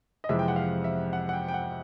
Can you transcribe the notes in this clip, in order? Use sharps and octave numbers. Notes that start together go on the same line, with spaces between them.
D#5
F2 C3 E3 G#3 E5
G5
F#5
F5
E5
F#5
F#5
G5
G5
F#5